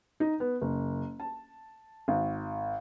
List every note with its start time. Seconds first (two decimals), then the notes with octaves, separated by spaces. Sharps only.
0.20 D#4
0.40 B3
0.62 F#1
1.20 A5
2.08 G#1